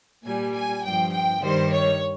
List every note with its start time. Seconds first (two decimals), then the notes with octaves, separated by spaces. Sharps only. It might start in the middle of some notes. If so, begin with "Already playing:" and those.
0.24 A#2 G3 G#5
0.53 G#5
0.83 G2 F3 G5
1.12 G5
1.41 G2 D#3 G3 C5
1.71 C#5